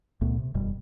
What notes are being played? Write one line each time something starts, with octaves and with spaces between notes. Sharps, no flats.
C#2 A#2 A3 B3
C3
E1 F#2 B2 G3